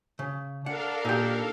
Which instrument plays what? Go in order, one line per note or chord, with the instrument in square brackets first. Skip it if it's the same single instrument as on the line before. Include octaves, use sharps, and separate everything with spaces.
[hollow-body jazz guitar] C#3
[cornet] D4 [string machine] A4 A#4 F5 [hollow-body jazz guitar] F#5
[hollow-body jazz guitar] A#2 [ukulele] D#4 G4